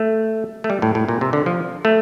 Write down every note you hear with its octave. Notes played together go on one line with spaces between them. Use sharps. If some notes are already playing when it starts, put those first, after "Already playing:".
Already playing: A3
A3
G3
A2
A2
A#2
C3
D3
F3
A3